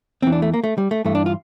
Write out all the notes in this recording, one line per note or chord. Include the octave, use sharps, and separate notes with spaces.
E2 E3 C4
D4
A3
A#3
A3
G3
A3
G2 E3 A3
D4
F4